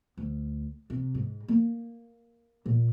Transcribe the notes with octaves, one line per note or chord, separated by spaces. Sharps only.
D2
C3
G#2
A#3
A#2